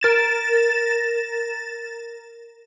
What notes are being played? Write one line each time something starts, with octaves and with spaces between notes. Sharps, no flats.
A#4 A6 E7